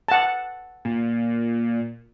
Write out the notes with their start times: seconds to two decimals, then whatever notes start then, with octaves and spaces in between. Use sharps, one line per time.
0.08 F#5 A5
0.85 A#2